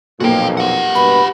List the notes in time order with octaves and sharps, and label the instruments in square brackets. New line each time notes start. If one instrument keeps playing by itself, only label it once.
[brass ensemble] B1 F2 [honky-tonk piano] A#2 A#3 [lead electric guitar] F#4 G5
[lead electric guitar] G4 F#5
[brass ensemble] G2 B2 B4 [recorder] B5